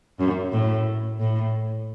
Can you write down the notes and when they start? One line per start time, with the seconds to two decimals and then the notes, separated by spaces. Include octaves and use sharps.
0.19 F#2
0.52 A2
1.19 A2